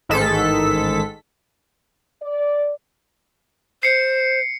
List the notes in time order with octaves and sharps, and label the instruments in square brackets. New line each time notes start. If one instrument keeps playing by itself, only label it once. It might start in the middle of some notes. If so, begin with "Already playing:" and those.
[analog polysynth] A1 G#2 D#3 G#3 A4 B6
[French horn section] D5
[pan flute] C5 [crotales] C7 C#7